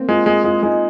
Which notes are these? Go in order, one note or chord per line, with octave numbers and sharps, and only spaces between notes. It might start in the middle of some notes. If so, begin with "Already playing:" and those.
Already playing: A#3 C4
G#3 F4
G#3 G#4
G#3 F4
G#3 D#4